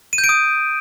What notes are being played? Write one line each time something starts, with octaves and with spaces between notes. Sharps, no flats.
D#7
G6
D7
D#6